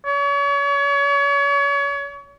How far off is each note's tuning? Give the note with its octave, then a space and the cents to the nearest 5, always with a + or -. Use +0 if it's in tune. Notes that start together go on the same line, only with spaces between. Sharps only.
C#5 +35